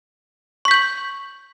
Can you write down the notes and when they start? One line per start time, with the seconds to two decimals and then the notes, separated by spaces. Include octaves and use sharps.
0.65 C#6
0.68 B6
0.71 G6
0.74 F#7